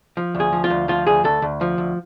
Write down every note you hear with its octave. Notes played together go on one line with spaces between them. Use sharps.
F3
D2
G#4
F3
F4
D2
F3 F4
D2 G#4
D2 A4
D2
F3
D2